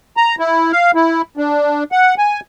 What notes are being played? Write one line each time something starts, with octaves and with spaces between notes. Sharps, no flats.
A#5
E4
F5
E4
D4
F#5
G#5